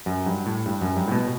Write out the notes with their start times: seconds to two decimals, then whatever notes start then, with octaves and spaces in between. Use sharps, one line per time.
0.06 F#2
0.26 G2
0.46 A2
0.66 G2
0.81 F#2
0.97 G2
1.07 A2
1.12 B2